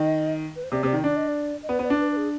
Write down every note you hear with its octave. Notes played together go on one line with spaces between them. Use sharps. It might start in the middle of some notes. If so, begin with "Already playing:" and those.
Already playing: D#3 D#5
B4
C5
C3 D5
C3 C5
D5
D#3
D4 D5
D#5
D5
D#5
B3 D5
B3 C5
D5
D4
B4
B4
G#4